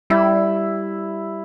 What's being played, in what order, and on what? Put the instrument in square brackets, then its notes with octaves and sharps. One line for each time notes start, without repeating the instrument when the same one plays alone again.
[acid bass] G3 [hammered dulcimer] E4